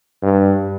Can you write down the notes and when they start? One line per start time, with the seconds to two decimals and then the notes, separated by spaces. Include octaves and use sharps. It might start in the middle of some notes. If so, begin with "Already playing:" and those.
0.23 G2